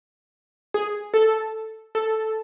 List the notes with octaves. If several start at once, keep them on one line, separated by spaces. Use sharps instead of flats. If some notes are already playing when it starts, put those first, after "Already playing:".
G#4
A4
A4